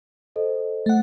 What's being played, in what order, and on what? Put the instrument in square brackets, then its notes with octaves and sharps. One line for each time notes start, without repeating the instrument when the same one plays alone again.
[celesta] A4 C5 D#5
[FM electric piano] A3 F#5